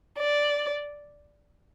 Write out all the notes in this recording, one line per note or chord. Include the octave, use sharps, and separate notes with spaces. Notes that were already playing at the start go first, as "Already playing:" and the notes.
D5